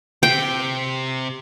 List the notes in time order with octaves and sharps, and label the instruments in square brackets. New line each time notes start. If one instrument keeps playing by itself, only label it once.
[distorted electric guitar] C3 [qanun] G5